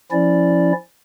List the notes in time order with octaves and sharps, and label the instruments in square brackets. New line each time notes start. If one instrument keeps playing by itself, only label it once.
[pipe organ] F3 C#4 E4 D5